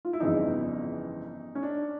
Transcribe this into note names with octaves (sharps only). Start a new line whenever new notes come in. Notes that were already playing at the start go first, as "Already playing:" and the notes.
F4
E4
G1 F2 C#3 E3 D#4
C#4
D4